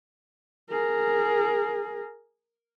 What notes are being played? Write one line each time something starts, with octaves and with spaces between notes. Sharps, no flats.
G#4 A#4